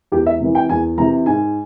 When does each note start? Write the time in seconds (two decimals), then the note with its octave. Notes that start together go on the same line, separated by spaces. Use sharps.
0.12 E2 G4
0.26 E5
0.40 C3 E3
0.55 G5
0.69 E2 G#5
0.97 C3 E3 A#5
1.26 G#2 G#5